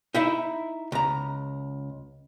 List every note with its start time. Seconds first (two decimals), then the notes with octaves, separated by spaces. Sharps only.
0.14 D#4 E4 E5
0.92 C#2 A#5